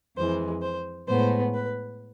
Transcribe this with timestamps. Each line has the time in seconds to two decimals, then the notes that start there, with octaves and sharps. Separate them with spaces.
0.17 F2 E3 G#3 C5
0.62 C5
1.08 A2 G#3 B3 C5
1.54 B4